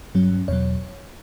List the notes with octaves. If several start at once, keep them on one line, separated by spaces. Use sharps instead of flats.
G2 F#3 C#4
E2 B2 F#3 C#5